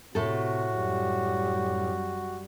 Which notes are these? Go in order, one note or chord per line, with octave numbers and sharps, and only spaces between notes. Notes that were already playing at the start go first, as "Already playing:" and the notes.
A2 C3 F#4 A4
F#2 G3